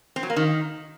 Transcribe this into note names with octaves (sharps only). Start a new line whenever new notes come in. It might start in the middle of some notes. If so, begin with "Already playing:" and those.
C4
F#3
A#3
D#3